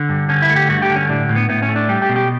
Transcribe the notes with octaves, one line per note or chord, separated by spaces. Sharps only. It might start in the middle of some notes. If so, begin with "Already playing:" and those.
Already playing: D3
G2
D3 C#4
E4
A3
G4
G2 F#4
G4
D3
C#4
A2 D4
A2
B3
A2 B3
C#4
A3
D4
G3 G4
G4
B2
G4